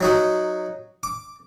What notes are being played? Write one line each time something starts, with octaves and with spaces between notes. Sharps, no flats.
F#3 D#4 F#4
D6